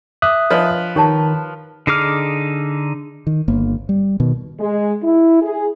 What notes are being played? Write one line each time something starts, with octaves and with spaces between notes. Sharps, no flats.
E5 D6 D#6 F#6
F3 D4 B4 C#5 D#5
D#3 G4 C#5 A5
D3 D#4 G#4 D6 F6
D#3
G1 A#3
G3
B2 D#3
G#3
E4
G#4